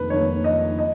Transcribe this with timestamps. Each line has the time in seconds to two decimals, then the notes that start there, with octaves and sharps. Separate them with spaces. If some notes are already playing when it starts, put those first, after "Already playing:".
Already playing: F1 F2 D#3 A#3 B4
0.10 F1 F2 D#3 A#3 C#5
0.44 D#5
0.79 D#5